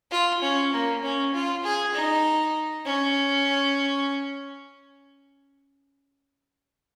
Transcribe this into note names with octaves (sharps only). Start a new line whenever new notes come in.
F4
C#4
A#3
C#4
F4
G#4
D#4
C#4